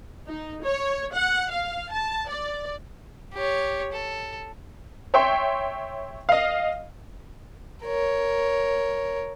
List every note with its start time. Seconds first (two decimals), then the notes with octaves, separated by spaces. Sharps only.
0.27 D#4
0.64 C#5
1.15 F#5
1.52 F5
1.92 A5
2.29 D5
3.34 G4 C#5
3.93 A4
5.14 C#5 E5 G5 C6
6.29 D#5 F5
7.85 A#4 C#5